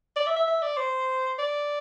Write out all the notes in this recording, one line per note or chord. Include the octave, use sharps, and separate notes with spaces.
D5
E5
E5
E5
D5
C5
D5